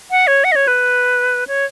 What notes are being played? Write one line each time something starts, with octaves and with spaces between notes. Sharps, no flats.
F#5
C#5
F#5
D#5
C#5
B4
C#5